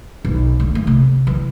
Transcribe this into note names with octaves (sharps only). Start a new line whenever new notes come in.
B1
D2
A3
C3
E3